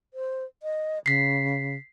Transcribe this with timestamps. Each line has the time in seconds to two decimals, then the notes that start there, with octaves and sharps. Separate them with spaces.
0.14 C5
0.63 D#5
1.06 C#3 B6 C7